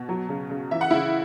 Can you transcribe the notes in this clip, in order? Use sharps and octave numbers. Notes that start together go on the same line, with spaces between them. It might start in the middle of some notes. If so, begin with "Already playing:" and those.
Already playing: B2
F#3
C#3
C#3
E3 E5
F#5
C#3 E4 E5